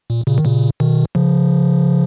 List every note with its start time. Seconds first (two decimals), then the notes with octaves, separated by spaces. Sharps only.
0.10 A#2
0.27 A#2 C#3
0.38 D#3
0.45 A#2 C#3
0.80 B2 D#3
1.15 C#3 F3